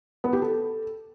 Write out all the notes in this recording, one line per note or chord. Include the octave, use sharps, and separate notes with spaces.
B3
G4
A4